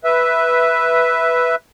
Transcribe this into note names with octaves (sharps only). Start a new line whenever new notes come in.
B4 E5